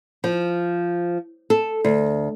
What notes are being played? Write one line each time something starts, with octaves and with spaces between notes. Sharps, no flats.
F3
A4
D2